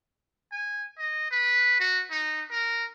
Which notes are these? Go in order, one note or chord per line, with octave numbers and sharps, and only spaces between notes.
G#5
D#5
B4
F#4
D#4
A#4